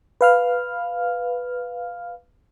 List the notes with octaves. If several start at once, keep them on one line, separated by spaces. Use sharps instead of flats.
B4 F5 F6